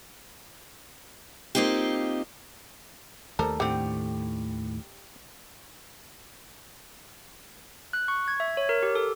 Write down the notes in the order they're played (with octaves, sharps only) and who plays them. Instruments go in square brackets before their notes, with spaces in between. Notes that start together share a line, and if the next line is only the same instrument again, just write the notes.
[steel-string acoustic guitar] A#3 C4 D#4 F4 G4
[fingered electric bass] D#2 D#3 A3 [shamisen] G3 A#4 C5 [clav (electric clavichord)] A4
[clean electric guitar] A2 [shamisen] D3 C4 [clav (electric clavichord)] G4
[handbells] F#6
C#6
G#6
E5
C#5
A#4
G4
A4